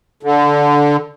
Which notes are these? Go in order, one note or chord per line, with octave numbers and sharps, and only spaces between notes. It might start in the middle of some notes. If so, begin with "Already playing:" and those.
D3